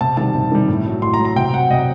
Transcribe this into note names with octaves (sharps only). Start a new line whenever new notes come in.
C3 A5
D#3 G3 A5
C3
D#3 G3
A2
F#3
A2 C6
A#5
F#3
A#5
C3 G5
F#3 F#5
C3 D#5